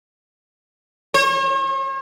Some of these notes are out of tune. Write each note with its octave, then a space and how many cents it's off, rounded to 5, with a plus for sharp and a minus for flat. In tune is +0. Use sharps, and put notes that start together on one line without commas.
C#5 -45